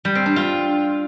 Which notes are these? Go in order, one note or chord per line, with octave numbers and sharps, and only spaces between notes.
G3
C4
D4
F4